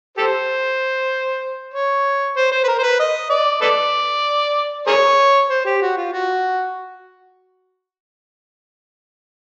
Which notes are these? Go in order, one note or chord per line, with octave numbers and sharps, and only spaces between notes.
G4 A4 C5
C#5
C5
C5
B4
A#4
C5
B4
D#5
D5
A4 B4 D5
G#4 A#4 C#5
C5
G4
F#4
F4
F#4